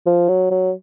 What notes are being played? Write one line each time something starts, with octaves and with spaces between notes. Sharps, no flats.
F3
F#3
F#3